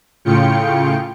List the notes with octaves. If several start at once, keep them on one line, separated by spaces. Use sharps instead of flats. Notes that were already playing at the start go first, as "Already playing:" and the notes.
A2 C#3 F4 G5 C#7